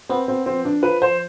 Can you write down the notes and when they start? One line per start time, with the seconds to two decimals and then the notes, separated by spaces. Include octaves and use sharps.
0.09 B3 C4
0.28 C4
0.46 F3 C4
0.65 D4
0.83 F3 B4
1.02 C5